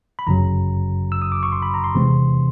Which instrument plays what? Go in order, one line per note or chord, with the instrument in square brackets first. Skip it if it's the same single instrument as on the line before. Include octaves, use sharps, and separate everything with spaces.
[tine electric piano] B5
G1 F#2 C#3 F#3 A#5
E6
D#6
D6
C#6
C6
B5
A#5
C6
E2 C3 E3 G#3 C4